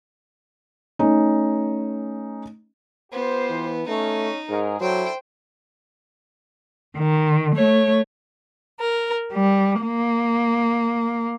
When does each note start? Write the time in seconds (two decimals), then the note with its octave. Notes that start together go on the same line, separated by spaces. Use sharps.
0.99 A3 C#4 D#4
3.12 B3 F4 G4 C5
3.49 E3
3.88 A3 C#4 D#4
4.49 G#2 G#4 A#4
4.81 F#3 D4 E4 A4 C5 G5
6.95 D#3
7.55 A3 C#5
8.79 A#4
9.33 G3
9.83 A#3